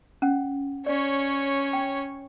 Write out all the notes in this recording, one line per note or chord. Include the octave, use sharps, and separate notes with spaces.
C#4 F#5
C#4 C#5 D5
G5